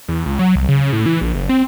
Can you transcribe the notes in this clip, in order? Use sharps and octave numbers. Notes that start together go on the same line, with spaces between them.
E2
C#2
F#3
C2
C#3
C#3
A2
E3
A#1
F#1
C4